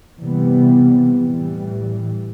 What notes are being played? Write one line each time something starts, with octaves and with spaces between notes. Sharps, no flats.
C3 E3 G3 B3
A2 E3 G3